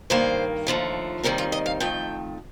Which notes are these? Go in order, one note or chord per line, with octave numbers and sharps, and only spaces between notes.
G2 D#3 A#3 C5
D#2 D3 F3 A3
D#2 D#3 G3 C4 A#4
F4
D#5
F5
F2 D#3 A3 G5